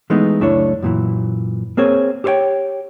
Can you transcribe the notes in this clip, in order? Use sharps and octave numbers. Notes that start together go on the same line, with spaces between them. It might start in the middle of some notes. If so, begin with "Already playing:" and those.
E3 G#3 A3 B3 D#4
C#2 F#2 A3 D4 E4 C#5
F#2 A#2 E3
A#3 C4 G#4 C#5
G4 A4 C5 C#5 G5